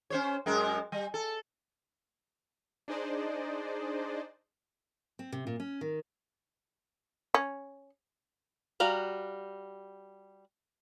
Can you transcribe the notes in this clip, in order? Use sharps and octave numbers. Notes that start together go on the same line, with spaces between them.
C#4 C5 C#5
F#2 G#3 A#4
G3
A4
D4 D#4 G#4 C5 D5 D#5
C4
C3
A#2
C#4
D#3
C#4
G3 F#4 F5 A#5